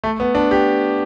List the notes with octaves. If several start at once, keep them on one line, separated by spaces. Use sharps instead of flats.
A3
B3
D4
G4